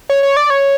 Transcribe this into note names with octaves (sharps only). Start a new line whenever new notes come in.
C#5
C#5
D5
C#5